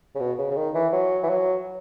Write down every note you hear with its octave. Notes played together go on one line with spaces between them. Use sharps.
C#3
B2
C#3
C#3
D#3
E3
F#3
E3
F#3